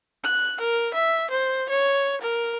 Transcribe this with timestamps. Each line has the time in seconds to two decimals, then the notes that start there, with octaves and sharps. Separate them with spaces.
0.24 F#6
0.61 A#4
0.94 E5
1.30 C5
1.69 C#5
2.21 A#4